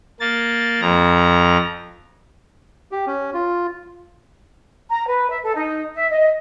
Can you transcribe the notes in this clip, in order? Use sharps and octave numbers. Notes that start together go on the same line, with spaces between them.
A#3 A6
F2 A#5
G4
C#4
F4
A#5
B4
E5
A4
D#4
E5
D#5